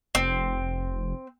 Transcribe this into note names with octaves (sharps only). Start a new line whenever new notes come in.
F1 C4